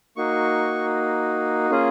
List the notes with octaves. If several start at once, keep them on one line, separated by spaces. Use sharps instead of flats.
A#3 D#4 F#4 C#6
A#3 C#4 F4 G#4